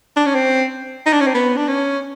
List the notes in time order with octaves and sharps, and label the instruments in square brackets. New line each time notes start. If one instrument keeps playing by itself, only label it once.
[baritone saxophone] D4
C#4
C4
D#4
D4
C#4
C4
B3
D4
C#4